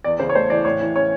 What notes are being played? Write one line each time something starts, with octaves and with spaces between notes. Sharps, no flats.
E2 D5
C#3 C5
C#5
A3 C5
E3 D5
A2 C#5
E3
C#4 C#5